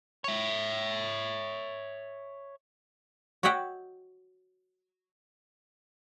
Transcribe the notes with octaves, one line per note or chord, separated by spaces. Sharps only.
C#5 E5
F#4 C#5 D#5 E5 F#5 G5